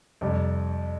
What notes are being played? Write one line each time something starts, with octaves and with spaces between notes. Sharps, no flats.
F2 C3 G3